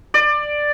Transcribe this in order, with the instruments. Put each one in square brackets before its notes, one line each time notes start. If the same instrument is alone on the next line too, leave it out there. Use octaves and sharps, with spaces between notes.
[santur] D5